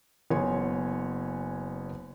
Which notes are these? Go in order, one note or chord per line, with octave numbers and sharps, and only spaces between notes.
F#1 B3 C#5 G#5 C6